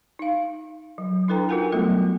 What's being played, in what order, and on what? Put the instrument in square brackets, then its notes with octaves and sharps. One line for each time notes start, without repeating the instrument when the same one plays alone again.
[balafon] D#4 F5
F#3
D4 E4 A4 B4 G5 A#5
D#4 F4 F#4 A#4 F#5 G#5
F#3 G3 A3 B3 A4 E5